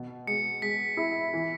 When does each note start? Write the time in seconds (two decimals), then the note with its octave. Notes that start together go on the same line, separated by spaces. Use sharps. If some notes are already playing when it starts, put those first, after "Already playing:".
Already playing: B2
0.27 G#3 C#7
0.62 G#3 B6
0.97 E4
1.34 E3